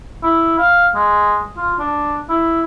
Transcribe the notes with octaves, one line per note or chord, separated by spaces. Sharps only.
E4
F5
G#3
F4
D4
E4